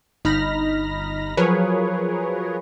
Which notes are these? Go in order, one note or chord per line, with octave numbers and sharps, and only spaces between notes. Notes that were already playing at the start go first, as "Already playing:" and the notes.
G1 D#4 B5 F6 A#6
F3 F#3 G#4 A#4 B4 C#5